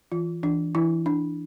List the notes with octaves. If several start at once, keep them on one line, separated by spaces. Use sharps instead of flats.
E3 F4
E3 D4
E3 E4
D4